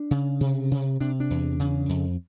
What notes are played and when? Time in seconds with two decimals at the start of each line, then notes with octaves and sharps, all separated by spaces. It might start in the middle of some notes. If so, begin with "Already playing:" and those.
Already playing: D4
0.11 C#3
0.41 C3
0.71 C3
1.00 C3 D4
1.20 D4
1.30 E2
1.60 C#3
1.89 F2